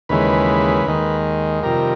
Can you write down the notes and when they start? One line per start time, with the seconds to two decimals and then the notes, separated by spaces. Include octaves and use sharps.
0.09 D#2 C#3 E3 G#3 B4
0.86 D#2 D#3 G#3
1.63 F2 C3 D#3 G3 A#4